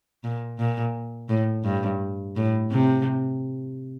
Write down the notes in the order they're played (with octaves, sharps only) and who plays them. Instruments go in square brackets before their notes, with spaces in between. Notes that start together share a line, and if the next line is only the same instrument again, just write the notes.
[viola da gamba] A#2
A#2
A2
G2
A2
C3